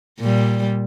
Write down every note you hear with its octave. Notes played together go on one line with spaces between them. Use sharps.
A#2 G3